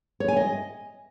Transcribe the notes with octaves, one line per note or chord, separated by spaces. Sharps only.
C#5
G#5
D#5